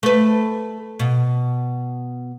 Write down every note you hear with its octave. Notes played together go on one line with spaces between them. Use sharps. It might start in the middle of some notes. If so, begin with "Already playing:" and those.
A3 B4
B2